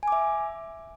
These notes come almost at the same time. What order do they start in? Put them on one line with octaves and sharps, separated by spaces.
G#5 D6 E5